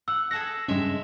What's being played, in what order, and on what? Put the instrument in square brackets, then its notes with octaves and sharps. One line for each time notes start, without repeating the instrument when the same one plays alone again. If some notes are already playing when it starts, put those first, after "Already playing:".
[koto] F#5 [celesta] E6
[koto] G#4 A4 F#5 [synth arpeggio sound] A#6
[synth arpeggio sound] G2 C#3 [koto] G#3 E5